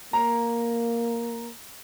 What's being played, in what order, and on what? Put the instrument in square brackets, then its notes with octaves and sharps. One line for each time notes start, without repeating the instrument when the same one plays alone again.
[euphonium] A#3 [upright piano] A#5